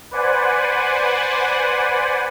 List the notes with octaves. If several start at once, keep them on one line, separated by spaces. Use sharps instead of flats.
B4 C5 D5 F#5 G#5